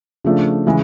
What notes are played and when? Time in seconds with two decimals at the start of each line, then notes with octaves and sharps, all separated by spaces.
0.24 C#3 F3 A3 D4
0.66 C#3 E3 G#3